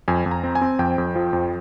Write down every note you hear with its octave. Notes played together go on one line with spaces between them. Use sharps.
F2 G#5
F2
A#5
C4
G#5
C4
F2 G5
F2
F3
F2